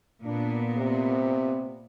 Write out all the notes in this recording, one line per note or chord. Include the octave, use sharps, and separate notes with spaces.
A#2 B3 D4
C3